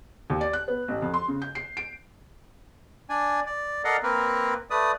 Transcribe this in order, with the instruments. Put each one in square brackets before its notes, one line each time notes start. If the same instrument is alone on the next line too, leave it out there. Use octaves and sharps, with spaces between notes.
[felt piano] D#2
D5
F#6
B3
A1
F2
C6
C#3
G6
C7
D7
[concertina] D4 D5 G#5
D5
A4 A#4 D5 D#5 F5 F#5
A#3 C4 A#4 B4
A3 B4 D5 D#6